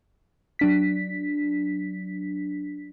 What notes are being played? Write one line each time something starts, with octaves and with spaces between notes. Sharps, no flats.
F#3 D4 B6